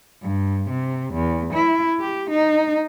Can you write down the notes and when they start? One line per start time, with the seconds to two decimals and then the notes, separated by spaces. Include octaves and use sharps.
0.22 G2
0.70 C3
1.13 E2
1.53 E4
2.00 G4
2.30 D#4